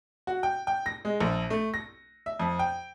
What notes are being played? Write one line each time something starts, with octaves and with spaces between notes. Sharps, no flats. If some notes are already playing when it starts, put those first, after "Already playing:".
F#4
G5
G5
A#6
G#3
A#1
A3
A#6
E5
F2
G5